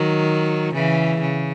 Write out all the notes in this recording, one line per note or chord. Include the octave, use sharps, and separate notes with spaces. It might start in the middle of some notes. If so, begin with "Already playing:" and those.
Already playing: D#3 F#3
C#3 E3
C#3